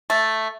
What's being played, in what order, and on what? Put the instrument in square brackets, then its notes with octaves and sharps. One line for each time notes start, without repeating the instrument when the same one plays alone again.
[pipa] A3